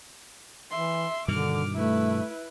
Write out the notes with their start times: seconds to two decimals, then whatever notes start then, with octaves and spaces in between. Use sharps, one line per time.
0.71 E3 E5 C6
1.28 G2 B2 D3 D#3 D6 F6
1.75 A3 E4 B4